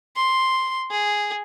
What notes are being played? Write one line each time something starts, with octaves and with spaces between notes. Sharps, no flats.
C6
G#4